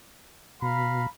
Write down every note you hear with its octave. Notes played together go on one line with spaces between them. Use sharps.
B2 F5 A#5 B5